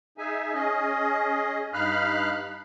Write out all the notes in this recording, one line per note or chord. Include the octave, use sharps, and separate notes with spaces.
D#4 G#4 E5 G#5
C#4 G#4 D#5
G2 D#4 F5 B5 F6 F#6